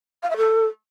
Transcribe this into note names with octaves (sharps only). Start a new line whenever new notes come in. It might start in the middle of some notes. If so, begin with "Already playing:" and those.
F5
E5
A4